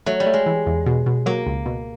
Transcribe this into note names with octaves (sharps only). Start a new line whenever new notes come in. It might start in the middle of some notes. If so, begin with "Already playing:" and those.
F#3 A3
G3
A3
G#3
E3
E2
B2
B2
F#3 A#3
C#2
B2